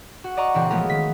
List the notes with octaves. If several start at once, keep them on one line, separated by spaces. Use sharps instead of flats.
F#4
D5 D#5 F#5 A#5 C#6
C#2 A#2 E3 C4 A#4 F#6
F3 G#3 A3 B3 A#4
D#3 B6